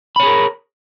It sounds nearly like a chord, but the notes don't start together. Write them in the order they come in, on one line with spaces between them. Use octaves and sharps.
B5 C#5 G#4 A#4